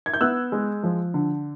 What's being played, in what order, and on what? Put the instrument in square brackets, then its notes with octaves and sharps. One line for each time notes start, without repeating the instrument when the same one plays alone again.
[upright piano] G#6
G6
B3 E6 F#6
G#3
F3
D3